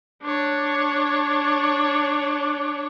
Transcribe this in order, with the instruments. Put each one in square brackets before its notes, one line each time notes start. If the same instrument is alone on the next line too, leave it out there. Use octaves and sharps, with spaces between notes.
[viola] D4 C#5